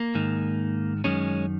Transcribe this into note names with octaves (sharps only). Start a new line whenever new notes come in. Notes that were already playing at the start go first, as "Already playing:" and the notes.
Already playing: A#3
G#2 D#3
F#2 D#3 G#3 C#4